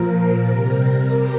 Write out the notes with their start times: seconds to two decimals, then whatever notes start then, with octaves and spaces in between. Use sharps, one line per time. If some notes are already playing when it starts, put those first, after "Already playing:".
Already playing: A#2 F3 A#4
0.46 C3 G3
1.02 G4